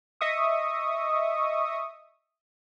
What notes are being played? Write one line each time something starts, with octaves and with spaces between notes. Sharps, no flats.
D#5 E5 C#6 D#6